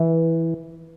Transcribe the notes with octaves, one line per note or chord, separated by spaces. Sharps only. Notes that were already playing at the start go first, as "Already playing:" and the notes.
Already playing: E3